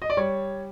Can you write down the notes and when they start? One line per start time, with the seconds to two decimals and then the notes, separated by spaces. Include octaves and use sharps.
0.02 D#5
0.10 D5
0.17 G3 C#5